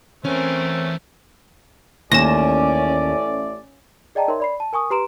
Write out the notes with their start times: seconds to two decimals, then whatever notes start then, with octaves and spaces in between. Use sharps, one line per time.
0.25 E2 A3 C4 C#4 A#4 G#5
2.12 A1 D#2 A3 C#4 D5 A#6 E7
4.15 G#4 D5 D#5 G5 A5 A#5
4.28 D#4 A#4 C#5 E5 C6
4.40 D5 B5 C7
4.60 A5
4.73 A#4 G#5 C#6 D#6
4.91 G4 B4 A#5 C6 D7 E7